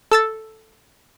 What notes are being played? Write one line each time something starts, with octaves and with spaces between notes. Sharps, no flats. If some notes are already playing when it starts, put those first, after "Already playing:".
A4 E6 A6